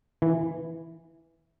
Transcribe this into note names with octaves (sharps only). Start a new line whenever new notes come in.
E3